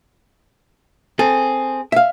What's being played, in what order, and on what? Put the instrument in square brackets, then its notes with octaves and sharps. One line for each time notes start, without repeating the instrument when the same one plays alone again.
[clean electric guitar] C4 G#4 [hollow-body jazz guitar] A4
[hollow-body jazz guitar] E5 F5